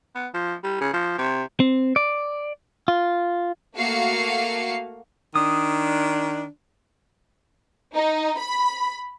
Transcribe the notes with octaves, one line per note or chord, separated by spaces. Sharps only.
B3
F3
G3
C#3
F3
C3
C4
D5
F4
A3 A#3 F#4 F5 C7 C#7
D#3 D4 D#6
D#4
B5